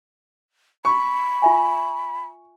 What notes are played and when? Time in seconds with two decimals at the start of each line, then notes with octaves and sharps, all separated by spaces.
0.85 B5 C#6
1.42 F4 E5 G#5